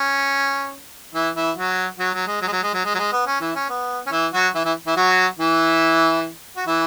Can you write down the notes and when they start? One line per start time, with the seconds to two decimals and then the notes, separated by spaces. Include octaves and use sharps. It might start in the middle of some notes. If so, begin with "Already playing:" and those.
Already playing: C#4
1.14 E3 E4
1.36 E3 E4
1.56 F#3 F#4
1.99 F#3 F#4
2.14 F#3
2.27 G#3
2.42 F#3
2.47 G#3
2.52 F#3
2.63 G#3
2.74 F#3
2.85 G#3
2.94 F#3
2.99 G#3
3.13 B3
3.27 C#4
3.41 E3 E4
3.55 C#4
3.69 B3
4.06 C#4
4.12 E3 E4
4.33 F#3 F#4
4.54 E3 E4
4.65 E3 E4
4.86 E3 E4
4.96 F#3 F#4
5.39 E3 E4
6.57 F#4
6.67 E3 E4